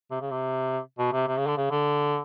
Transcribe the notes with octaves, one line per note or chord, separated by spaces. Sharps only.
C3
C#3
C3
B2
C3
C3
C#3
D3
C#3
D3